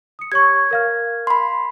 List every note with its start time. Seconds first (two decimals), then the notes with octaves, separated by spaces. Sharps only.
0.19 D#6 C#7
0.32 G4 C#5 C#6 G#6
0.71 A#4 F5 F6
1.27 B5 C6